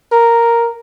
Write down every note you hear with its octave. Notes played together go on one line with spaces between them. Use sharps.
A#4